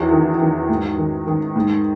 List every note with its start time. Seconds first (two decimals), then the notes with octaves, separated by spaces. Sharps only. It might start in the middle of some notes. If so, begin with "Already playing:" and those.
Already playing: E2 D#3 F#3
0.11 D#3
0.40 D#3
0.69 G#2
0.98 D#3
1.27 D#3
1.56 G#2